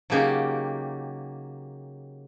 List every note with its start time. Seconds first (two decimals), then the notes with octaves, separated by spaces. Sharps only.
0.10 C#3 F#3 A#3 D#4 G4